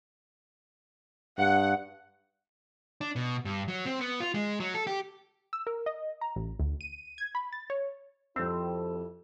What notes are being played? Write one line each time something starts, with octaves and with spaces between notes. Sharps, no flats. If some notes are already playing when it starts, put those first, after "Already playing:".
G2 F#5
D4
B2
G2
F#3
C4
B3
F4
G#3
F#3
A4
G4
E6
A#4
D#5
A#5
A1
D2
D#7
G#6
B5
A6
C#5
F2 C4 E4 G4 A4 E6